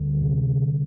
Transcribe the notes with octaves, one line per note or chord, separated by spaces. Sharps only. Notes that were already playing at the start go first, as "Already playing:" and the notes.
Already playing: D2 D3 G3
C3